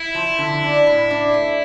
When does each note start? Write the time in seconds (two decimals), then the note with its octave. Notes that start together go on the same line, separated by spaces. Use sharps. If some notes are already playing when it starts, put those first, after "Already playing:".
Already playing: E4
0.14 F3
0.38 D3
0.63 D4
0.87 A2
1.11 D4
1.34 A3